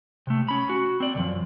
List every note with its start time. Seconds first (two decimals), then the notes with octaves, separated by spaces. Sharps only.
0.27 C3 A3
0.48 C#4 B5
0.69 F#4
1.00 C4 D5
1.15 C#2 F#2 F3